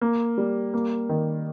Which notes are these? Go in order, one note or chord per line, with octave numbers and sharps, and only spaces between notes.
A#3
G3
A#3
D#3